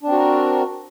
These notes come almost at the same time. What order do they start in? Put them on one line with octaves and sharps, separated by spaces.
D4 C4 F#4 A#4